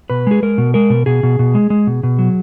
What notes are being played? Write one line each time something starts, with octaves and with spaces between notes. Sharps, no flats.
B2 B4
G#3 G#4
G#3 A#4
B2
G#3 A#4
B2
B2 G#4
B2
B2
G#3
G#3
B2
B2
F#3